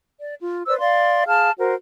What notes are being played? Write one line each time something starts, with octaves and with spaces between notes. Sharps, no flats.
D5
F4
B4 C5 D5 E6
D5 F5 C6
G#4 F5 A5 F6
F#4 A#4 C5